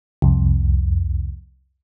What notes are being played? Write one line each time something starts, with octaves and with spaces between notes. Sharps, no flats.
C2 F2